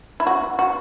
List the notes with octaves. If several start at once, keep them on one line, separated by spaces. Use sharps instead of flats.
E4
F#4
F#4